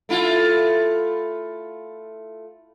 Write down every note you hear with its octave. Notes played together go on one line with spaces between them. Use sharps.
A3 E4 F4